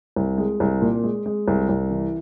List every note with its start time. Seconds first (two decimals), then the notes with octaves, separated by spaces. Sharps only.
0.16 C2
0.38 G#3
0.60 C2
0.82 A#2
1.04 G#3
1.26 G#3
1.48 C2
1.69 C2
1.90 E3